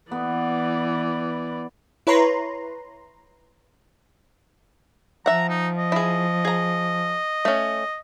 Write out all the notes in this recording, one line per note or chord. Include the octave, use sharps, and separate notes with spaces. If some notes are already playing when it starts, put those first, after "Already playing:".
E3 B3 D5
E4 B4 C#5 A#5 C6
F3 E5 F#5 A#5
D#4
D#5
E4 G#4
G#4 A#5
A3 C#4